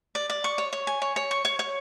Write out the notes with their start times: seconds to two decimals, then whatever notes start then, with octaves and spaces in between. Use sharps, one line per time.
0.15 D5
0.30 D5
0.44 C#6
0.58 C#5
0.73 C#5
0.87 G#5
1.02 C#5
1.16 C#5
1.31 C#6
1.45 C#5
1.59 C#5